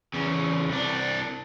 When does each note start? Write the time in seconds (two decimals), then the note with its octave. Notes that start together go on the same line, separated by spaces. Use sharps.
0.14 E2 C#3
0.68 C2 D4